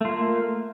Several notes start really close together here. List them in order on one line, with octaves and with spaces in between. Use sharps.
A3 F4 A#3